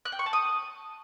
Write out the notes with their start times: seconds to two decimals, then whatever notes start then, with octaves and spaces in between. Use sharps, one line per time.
0.05 F#6
0.12 G5
0.19 C#6
0.26 A5
0.33 D#6